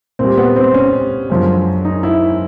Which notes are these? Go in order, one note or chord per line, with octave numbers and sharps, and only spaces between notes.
A#2 G3 C4
B3
C4
C#4
F#2 D3 F3 G#3
D#4
E4